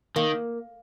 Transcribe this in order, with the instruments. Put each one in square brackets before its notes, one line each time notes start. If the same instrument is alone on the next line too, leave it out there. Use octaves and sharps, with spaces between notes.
[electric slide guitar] D#3 [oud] A#3